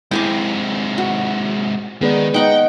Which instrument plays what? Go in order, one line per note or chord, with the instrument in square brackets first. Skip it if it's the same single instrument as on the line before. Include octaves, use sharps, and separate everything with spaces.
[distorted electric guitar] G#2 C3 [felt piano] E4 [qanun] G5 G#5 D6
[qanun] F#4
[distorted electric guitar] D#3 [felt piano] G#3 B3 D5
[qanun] D#4 F#5 C#6 [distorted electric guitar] G5